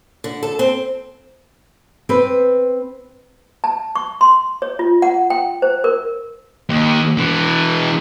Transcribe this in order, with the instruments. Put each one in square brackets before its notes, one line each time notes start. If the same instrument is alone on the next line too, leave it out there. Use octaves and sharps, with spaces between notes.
[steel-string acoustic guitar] D3
A4
C4
[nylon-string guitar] C4 B4
[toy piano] A5
C#6
C6
C#5
F4
F#5
G5
C5
A#4
[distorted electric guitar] D#2
B2 E3